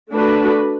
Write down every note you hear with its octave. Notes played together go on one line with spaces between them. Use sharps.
A3 D4 F#4 B4